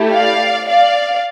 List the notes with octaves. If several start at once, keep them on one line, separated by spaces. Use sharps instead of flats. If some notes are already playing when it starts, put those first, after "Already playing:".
Already playing: A3 E4 G4
D5 F5
D5 F5